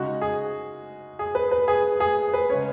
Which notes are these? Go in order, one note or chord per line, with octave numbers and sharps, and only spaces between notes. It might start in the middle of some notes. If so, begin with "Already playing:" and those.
Already playing: C#3 G#3 D#4 F#4
G#4
G#4
B4
B4
G#4
G#4
B4
C#3 G#3 C#4 C#5